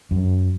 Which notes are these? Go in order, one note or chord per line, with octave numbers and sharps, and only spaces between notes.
F#2